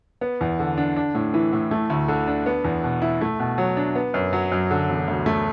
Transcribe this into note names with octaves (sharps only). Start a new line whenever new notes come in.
B3
E2
D3
D4
D4
A2
E3
A2
A3
D2
D3
D4
B3
E2
B2
E4
A3
B2
F#3
D4
B3
F#2
F#3
F#2
D3
E1
D2
A3